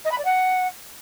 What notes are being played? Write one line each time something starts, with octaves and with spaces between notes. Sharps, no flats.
D#5
B5
D5
F#5